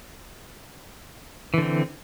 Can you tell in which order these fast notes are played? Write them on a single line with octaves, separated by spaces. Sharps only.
E3 D3 C4